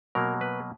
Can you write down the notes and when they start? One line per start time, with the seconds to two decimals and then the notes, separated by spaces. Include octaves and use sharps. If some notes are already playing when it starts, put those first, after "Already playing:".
0.15 B2 F#3 A#3 A#4
0.41 B4